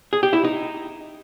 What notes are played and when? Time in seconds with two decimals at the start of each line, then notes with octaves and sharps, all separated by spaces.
0.13 G#4
0.23 G4
0.33 E4
0.44 D#4